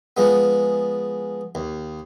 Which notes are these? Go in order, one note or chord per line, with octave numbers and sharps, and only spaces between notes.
F3 G#3 B3
D#2